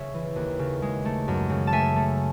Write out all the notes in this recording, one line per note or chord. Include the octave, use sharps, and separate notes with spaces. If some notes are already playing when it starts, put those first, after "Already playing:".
Already playing: C#3 C#5 E5
E3
D#2
C#3
G#3
A3
F#2
C#3
A5
A3 E5 G#5
A3